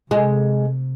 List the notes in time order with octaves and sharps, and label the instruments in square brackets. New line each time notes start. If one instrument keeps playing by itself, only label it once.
[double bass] C3 [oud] G#3